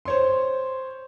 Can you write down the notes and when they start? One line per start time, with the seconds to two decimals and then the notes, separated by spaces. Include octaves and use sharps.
0.05 C5 C#5 C6